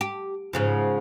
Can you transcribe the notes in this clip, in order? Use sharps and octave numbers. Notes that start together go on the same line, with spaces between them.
G4
G#2 C#3 F3